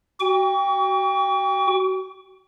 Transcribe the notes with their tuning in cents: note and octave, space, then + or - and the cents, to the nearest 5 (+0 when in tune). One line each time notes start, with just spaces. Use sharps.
F#4 +30 G5 +25 C#6 +45